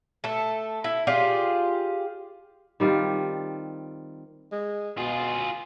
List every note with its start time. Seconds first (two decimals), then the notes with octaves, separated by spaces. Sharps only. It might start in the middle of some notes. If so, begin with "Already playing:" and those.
0.24 A3 A4
0.84 E4
1.07 F4 G4 G#4 D5
2.80 D#3 G3 C4 F4
4.52 G#3
4.98 B2 F4 G#4